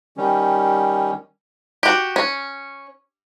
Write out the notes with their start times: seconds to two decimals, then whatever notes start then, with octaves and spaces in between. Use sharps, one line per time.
0.17 D#3 G3 C#4
1.83 F#4 G4
2.16 C#4